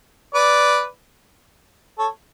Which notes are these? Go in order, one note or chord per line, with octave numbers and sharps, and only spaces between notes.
B4 D5
A4 C#5